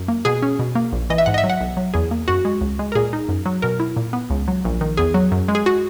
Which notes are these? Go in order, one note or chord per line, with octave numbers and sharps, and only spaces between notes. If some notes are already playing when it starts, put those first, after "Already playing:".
Already playing: F#2
A#3
B2 G#4
C#4
B2
A#3
A#1
E3 D#5
E5
G#2 F#5
D#5
E5
F#3
F#5
B1
F#3
E2 G#4
A#3
F#2 F#4
G#3
C#2
G#3
A#4
A#2 G#4
D#4
F#2
F#3
B2 A#4
E4
A#2
B3
C#2
F#3
A#1
D#3
E2 G#4
F#3
F#2
G#3
G#4
F#4